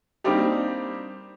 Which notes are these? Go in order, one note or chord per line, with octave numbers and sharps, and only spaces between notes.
G3 A#3 C4 D4 D#4 G4